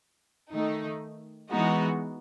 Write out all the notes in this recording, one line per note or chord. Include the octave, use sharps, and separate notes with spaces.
D#3 A3 D#4
E3 G#3 B3 D#4 F#4